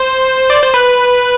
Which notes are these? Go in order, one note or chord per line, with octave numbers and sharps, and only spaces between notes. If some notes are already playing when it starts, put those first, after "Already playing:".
Already playing: C5
D5
C5
B4